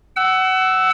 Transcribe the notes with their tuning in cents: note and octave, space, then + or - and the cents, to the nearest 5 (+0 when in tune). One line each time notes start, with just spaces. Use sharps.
F#5 +25 E6 +0